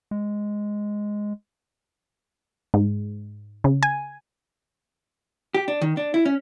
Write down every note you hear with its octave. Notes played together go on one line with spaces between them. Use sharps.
G#3
G#2
C#3
G#5
G4
D4
D#3
D4
E4
C#4